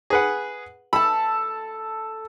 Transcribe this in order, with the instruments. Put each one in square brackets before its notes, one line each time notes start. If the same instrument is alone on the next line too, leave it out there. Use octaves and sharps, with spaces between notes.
[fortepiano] G#4 B4 F#5
[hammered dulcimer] A4 A5 [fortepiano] B5